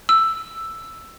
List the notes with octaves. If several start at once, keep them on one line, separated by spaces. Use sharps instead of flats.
E6